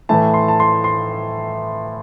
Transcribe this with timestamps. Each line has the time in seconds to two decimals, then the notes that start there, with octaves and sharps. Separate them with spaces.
0.09 A2 E3 A3 A5
0.34 C6
0.48 A5
0.60 C6
0.84 C6